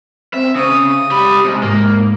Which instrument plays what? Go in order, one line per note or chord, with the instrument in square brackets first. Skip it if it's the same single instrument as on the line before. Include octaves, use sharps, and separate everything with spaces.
[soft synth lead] C4 [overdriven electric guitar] E5
[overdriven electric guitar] C#3 [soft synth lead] D#6
[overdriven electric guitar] G4 B5
C3 G#3
[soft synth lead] G#2 [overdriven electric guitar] A#3